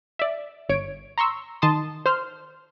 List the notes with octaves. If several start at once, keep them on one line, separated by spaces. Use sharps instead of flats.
D5 E5
G1 C#5 D7
A#5 C6 C#6 E6
D#3 A5 C6 D#6
C5 C6 F6